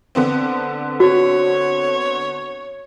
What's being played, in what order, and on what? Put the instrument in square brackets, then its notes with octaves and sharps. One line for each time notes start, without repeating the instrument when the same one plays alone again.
[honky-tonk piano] D3 B3 C4
[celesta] F#4 [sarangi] C#5